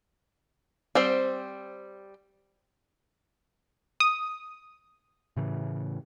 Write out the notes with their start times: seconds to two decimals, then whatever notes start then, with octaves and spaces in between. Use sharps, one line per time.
0.95 G3 C4 C5
4.00 D#6
5.37 A2 C#3 E3